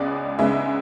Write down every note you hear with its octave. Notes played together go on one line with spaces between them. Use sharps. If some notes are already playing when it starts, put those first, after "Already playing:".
Already playing: C#2 C#3 G#3 B3 D5
C#2 C#3 G#3 B3 E5